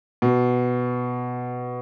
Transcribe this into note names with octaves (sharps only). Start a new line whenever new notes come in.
B2